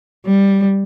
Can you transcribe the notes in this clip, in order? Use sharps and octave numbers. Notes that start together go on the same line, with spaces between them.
G3